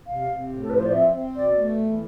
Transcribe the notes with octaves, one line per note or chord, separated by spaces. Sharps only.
C3 F5
C3
A2
A4
F3 B4
C5
D5
C4 E5
C4
B2 D5
A3
E2